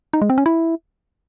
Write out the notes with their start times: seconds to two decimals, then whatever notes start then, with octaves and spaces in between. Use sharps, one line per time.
0.13 D#4
0.21 G#3
0.30 C4
0.38 C#4
0.46 E4